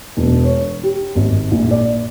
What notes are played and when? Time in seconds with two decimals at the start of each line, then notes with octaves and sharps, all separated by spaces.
0.17 E1
0.45 C#5
0.83 G4
1.15 G#1
1.51 A#1
1.71 D5